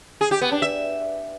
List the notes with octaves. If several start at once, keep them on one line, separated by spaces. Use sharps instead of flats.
G#4
G4
B3
D4
E5